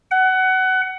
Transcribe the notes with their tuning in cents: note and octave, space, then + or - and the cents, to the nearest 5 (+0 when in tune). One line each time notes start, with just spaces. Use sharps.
F#5 +20